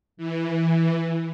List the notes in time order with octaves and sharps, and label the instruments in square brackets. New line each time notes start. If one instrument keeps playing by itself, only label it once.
[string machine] E3